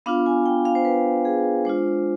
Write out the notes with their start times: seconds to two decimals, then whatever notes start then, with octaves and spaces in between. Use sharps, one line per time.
0.06 B3 D4 F4 F5
0.26 G#5
0.46 G5
0.65 F5
0.75 C5
0.85 B4
1.25 G#4
1.65 G#3 D4 F4 C5